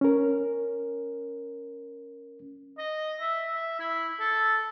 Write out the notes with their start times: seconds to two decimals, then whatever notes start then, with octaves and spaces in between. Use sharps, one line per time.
0.01 C#4 A#4
2.78 D#5
3.20 E5
3.55 E5
3.79 E4
4.20 A4